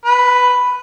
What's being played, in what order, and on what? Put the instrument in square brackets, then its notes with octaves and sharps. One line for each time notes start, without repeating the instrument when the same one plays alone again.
[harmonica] B4